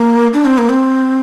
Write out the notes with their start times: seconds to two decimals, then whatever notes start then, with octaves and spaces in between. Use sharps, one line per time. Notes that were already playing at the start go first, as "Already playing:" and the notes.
Already playing: A#3
0.33 D4
0.45 C4
0.58 A#3
0.69 C4